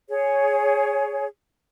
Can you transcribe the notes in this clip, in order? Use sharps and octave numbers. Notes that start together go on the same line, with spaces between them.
G#4 C#5